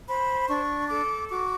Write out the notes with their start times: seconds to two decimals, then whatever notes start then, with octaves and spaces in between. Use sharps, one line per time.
0.06 C5 B5
0.48 D4 C#6
0.89 A4 D6
1.29 F#4 D6